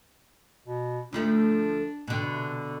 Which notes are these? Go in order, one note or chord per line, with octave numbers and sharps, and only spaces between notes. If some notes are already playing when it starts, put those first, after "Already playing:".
B2
D2 F3 A3 D4
B2 D3
C3